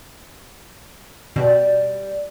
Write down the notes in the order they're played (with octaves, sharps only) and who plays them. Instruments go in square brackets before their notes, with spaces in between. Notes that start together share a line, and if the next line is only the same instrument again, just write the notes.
[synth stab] B2 [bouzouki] G3